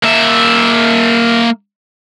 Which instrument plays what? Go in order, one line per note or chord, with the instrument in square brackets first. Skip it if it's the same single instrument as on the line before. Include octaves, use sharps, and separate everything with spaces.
[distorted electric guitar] A#3 E5